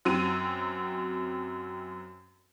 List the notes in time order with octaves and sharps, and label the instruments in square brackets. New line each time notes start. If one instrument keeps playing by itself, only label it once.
[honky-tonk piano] F#2 F#3 C4 D#7